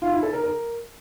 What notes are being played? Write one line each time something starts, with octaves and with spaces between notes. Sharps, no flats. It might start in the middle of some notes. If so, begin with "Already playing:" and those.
F4
E4
A4
A#4
A#4